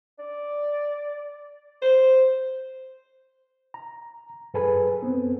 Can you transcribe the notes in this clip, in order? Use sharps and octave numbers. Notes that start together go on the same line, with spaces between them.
D5
C5
A#5
F#2 G#4 A4 B4 G#5
B3 C4